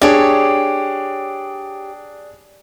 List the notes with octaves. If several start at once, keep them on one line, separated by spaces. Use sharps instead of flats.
D4 G4 G#4 C#5